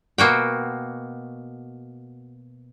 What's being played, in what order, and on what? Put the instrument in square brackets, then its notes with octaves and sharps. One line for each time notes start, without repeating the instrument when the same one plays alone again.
[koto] B2 A#3 F#4 G5